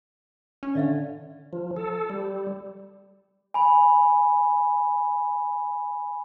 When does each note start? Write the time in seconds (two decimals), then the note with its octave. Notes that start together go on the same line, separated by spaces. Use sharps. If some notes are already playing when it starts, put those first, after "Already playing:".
0.63 C#4
0.75 D3 D5 E5 F5
1.53 F3
1.76 A4
2.10 G3
3.54 G#5 B5